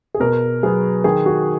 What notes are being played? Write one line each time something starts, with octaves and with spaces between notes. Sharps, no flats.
G#4
B2 A#4
F#3 B3 G#4
D#3 G#4
F#4